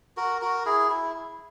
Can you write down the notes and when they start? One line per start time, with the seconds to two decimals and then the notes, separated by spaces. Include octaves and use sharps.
0.17 F#4 A#4
0.42 F#4 A#4
0.65 E4 G#4
0.90 E4